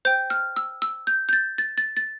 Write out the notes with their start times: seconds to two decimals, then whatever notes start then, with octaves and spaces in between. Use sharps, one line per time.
0.05 C5 G5 G6
0.30 F6
0.56 E6
0.82 E6
1.07 G6
1.29 G6
1.33 A6
1.58 A6
1.78 A6
1.97 A6